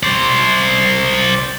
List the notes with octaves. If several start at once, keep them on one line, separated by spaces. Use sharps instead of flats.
C5 D5